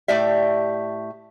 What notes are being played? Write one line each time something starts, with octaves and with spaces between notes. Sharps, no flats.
A2 A3 G4 D5 E5